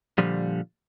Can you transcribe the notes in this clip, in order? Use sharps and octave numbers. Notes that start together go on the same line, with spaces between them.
A#2 D3 F3 G3